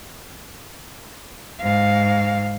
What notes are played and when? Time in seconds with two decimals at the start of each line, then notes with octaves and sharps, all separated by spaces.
1.61 G#2 F5